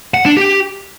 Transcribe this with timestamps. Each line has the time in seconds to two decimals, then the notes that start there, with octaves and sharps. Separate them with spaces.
0.14 F#5
0.25 D4
0.37 G4